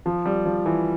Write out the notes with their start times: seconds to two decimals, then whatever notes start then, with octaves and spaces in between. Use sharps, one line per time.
0.06 F3
0.25 G3
0.46 F3
0.66 E3